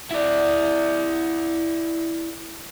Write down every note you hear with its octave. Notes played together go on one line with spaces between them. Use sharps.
E4 D5